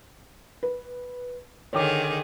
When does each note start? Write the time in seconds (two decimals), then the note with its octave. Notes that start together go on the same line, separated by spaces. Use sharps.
0.63 B4
1.73 D3 D#3 G#4 C#5 G5 D6